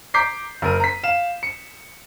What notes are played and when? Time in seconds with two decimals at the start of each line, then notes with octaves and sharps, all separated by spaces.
0.14 A#5 D6 G6 B6 C7
0.62 F#1 A#4 D#7
0.80 A#5 B6
1.03 F5 E7
1.43 C#7